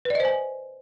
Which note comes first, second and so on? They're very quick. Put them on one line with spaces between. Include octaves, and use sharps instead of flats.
B4 D5 D#5 C5 G#5